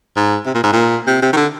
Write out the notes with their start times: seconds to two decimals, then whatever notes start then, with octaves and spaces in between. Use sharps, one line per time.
0.16 G#2
0.46 C3
0.55 A#2
0.64 G#2
0.73 A#2
1.07 C3
1.22 C3
1.33 D#3
1.37 D3